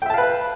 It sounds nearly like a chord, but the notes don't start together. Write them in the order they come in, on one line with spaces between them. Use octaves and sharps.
G5 E5 A5 F5 B4